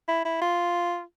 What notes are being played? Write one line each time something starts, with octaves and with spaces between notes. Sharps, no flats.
E4
E4
F4